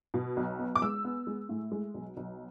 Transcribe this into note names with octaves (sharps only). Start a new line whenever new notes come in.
B2
B1
B3
D6
G#3 E6
B3
G#3
A2
G#3
B1
B1